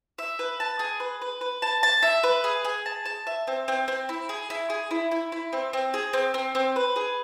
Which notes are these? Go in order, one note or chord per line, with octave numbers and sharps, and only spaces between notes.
E5
B4
A5
G#4
B4
B4
B4
A5
A5
E5
B4
G#4
G#4
A5
A5
E5
C4
C4
C4
E4
G#4
E4
G#4
E4
E4
E4
C4
C4
G#4
C4
C4
C4
B4
G#4